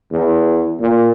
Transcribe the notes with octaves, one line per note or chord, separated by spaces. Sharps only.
E2
A#2